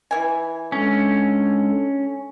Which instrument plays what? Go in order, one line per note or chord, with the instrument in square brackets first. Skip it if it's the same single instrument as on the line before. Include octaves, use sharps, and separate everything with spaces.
[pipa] E3 G#5
[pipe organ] G#3 D4 A4 [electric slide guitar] C#4